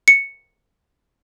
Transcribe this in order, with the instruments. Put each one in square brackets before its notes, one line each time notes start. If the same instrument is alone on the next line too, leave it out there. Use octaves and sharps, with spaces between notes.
[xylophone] C#7